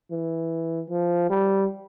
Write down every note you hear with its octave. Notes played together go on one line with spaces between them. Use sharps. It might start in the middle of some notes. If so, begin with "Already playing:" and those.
E3
F3
G3